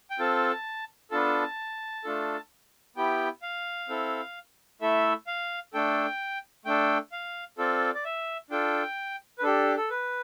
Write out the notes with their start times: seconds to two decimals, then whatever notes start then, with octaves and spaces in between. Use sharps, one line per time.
0.11 G5
0.19 C4 F4 A4 A5
1.11 B3 D4 F4 A4 A5
2.04 A3 D4 F4 A4
2.96 B3 E4 G4 G5
3.42 F5
3.89 C4 E4 A4
4.81 A3 E4 A4 E5
5.27 F5
5.74 A3 D4 A4 G5
6.66 A3 D4 A4 G5
7.12 F5
7.58 C4 F4 A4 D5
7.95 D5
8.05 E5
8.50 D4 F4 A4 G5
9.39 B4
9.43 D4 G4 A4
9.77 A4
9.90 B4